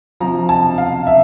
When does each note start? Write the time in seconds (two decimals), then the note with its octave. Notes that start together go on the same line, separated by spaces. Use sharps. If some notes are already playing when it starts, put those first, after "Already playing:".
0.20 C3 F3 A#5
0.49 A5
0.78 F5
1.07 E5